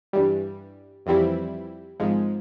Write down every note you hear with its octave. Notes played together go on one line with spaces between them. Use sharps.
G2 E3 G3
F2 E3 G3 C4 E4
G#1 G#2 F3 G#3